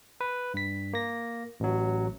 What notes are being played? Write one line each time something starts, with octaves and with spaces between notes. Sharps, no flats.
B4
G2 B6
A#3 A#6
A1 F#3